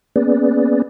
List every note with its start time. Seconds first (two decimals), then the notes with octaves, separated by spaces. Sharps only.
0.16 A#3 B3 C#4 G#4 B4 D5